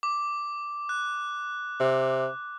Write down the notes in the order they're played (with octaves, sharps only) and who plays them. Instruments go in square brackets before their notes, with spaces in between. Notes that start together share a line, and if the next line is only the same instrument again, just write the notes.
[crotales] D6
F#6
[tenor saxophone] C3